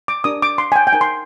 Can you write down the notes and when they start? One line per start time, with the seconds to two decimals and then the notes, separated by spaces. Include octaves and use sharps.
0.08 D6
0.24 D4 G4 A#4 D#6
0.42 D6
0.58 C6
0.72 G#5
0.76 G5
0.87 G5
0.93 D#4 A#4 G#5
1.01 C6